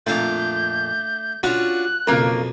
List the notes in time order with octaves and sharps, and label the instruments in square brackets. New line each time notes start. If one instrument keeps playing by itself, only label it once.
[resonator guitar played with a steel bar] F2 A#2 [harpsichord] A3 D4 F5 [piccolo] G6
[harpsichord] C#4 D4 F4 [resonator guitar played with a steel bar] F#4 [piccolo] F#6
[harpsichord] B1 F2 [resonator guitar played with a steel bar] C#3 A#3 A#4